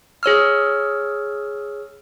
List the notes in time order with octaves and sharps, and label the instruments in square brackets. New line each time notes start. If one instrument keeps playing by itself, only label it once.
[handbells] G#4 C#5 E6 F6